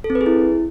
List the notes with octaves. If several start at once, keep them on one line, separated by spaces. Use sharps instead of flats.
A4
C4
B4
G#4
E4